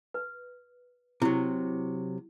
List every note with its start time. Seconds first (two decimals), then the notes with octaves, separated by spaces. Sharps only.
0.14 B4
1.22 C3 F#3 E4